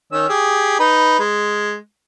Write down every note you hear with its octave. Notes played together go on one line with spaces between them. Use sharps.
D#3 C#4 E6
G4 G#4
D#4 B4
G#3